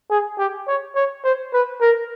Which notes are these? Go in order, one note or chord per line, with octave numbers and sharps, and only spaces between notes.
G#4
G4
C#5
C#5
C5
B4
A#4